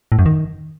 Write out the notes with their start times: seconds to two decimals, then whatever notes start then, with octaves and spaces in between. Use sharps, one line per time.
0.12 A2
0.19 F#2
0.26 D#3